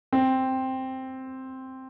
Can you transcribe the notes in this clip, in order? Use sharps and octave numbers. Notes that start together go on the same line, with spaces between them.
C4